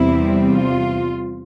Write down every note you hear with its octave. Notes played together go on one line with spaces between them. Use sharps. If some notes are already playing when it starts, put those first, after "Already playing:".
Already playing: E2 C3 G3 C4 E4
F4